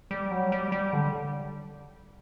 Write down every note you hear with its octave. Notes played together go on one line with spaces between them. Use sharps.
G3
F#3
G3
G3
D3